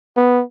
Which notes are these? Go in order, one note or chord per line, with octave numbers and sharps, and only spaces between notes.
B3